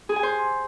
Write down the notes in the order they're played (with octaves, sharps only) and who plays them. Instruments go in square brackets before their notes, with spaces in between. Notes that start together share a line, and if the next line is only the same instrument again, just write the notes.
[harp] G#4
G#5
C5